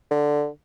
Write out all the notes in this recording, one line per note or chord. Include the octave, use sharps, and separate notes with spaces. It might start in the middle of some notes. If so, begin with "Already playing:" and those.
D3